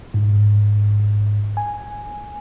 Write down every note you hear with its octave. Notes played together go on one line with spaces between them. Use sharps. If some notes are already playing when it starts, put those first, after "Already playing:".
G#2
G#5